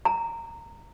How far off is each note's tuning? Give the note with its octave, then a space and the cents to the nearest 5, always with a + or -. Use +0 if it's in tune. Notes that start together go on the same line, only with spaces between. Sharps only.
A#5 -15